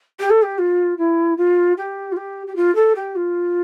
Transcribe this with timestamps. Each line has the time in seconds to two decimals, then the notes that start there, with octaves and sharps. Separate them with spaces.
0.19 G4
0.30 A4
0.42 G4
0.58 F4
0.98 E4
1.37 F4
1.77 G4
2.12 F4
2.16 G4
2.47 G4
2.55 F4
2.75 A4
2.95 G4
3.15 F4